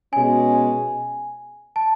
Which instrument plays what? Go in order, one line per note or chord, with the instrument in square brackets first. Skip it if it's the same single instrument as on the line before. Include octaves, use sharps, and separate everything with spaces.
[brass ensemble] B2 G#3 C#4 [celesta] G#5
[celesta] A5